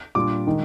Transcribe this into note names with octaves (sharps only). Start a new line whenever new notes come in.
A#2 G3 D4 F4 D6
D#3 G#3 D#4